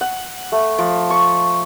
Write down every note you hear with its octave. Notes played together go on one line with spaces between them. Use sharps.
F#5
A3
F3
C#6